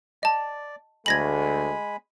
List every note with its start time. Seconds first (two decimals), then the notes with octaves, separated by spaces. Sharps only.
0.23 D5 D#5 A5
1.06 D2 G#3 A3 G#5 B5 G#6 A#6 F#7